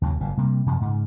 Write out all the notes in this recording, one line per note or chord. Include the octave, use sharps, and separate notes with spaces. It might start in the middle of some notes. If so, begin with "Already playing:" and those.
D#2 C#3 F3 F#3
F#1 G2 A#2
C3 G3 A#3
F#2 C3 F3 F#3
G#2 C#3